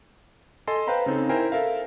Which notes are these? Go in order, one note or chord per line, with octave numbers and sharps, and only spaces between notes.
A4 D#5 G#5 C6
B4 C5 F5 G5 A#5 B5
C#3 C4 D#4 A4
E4 A#4 C5 G5 G#5 A#5
A4 A#4 E5 F5